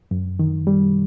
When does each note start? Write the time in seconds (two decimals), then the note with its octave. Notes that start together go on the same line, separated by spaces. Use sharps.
0.11 F#2
0.39 D#3
0.67 G3